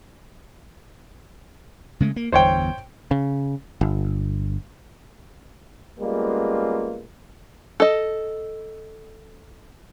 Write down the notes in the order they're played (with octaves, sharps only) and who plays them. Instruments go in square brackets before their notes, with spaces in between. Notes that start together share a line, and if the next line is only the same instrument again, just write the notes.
[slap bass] C#3 G#3 A3
A#3
[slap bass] G1 E2 G2 [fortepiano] C5 C#5 G5
[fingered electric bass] C#3
G1
[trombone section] G3 G#3 A#3 B3 C#4 F4
[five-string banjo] A4 D#5